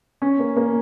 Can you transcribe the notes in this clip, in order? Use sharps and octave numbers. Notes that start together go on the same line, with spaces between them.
C#4
A#3
A#3